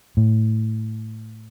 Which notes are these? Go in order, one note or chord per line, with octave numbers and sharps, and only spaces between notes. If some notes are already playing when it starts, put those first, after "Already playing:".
A2